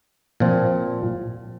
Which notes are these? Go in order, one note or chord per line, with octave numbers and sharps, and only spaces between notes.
A#2 F3 C4